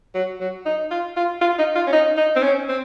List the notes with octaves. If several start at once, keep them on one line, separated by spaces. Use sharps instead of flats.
F#3
F#3
D#4
F4
F4
F4
D#4
F4
C#4
D#4
D#4
C4
C#4
C4